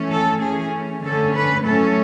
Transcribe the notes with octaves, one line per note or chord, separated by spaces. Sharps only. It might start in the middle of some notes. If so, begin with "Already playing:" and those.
Already playing: E3 A3 C#4
A4
E3 A3 C#4 G#4
D3 A3 C#4 A4
B4
A2 F#3 A3 C#4 A4